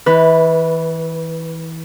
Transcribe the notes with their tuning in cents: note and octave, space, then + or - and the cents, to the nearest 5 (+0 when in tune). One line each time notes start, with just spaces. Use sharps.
E3 -25 B4 +0